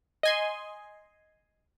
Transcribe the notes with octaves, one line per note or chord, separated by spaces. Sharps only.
D#5 G#5 C6